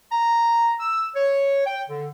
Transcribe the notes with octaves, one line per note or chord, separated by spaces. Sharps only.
A#5
E6
C#5
G5
D3